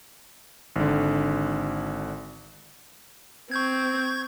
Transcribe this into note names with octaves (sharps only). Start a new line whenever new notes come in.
G#1 D3
C4 C#6 G6 G#6